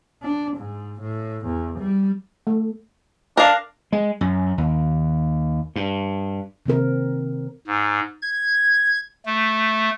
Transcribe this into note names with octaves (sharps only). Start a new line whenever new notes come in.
D4
G#2
A2
E2
G3
A3
D4 A#4 F5
G#3
F#2
D#2
G2
C3 D#3 C4 A#4
G#2
G#6
A3